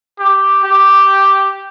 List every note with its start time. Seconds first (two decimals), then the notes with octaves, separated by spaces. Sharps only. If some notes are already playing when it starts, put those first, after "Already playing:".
0.19 G4
0.64 G4